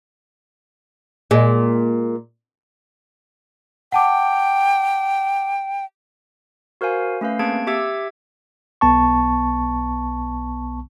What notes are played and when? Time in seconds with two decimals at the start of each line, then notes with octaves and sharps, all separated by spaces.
1.31 A#2 G#3
3.92 F#5 G5 A5 D6
6.81 F#4 A#4 C5 F5 G#5
7.21 A3 C#4 B4 F5
7.39 A#3 C4 G#4 A5 G#6 D7
7.67 G4 E5 D6 E6 G#6
8.81 B1 B3 A5 C#6